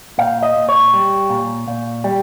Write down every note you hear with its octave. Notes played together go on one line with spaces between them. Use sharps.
A#2 F5
D#5
A#2
C#5
G3
A#2
A#2
G3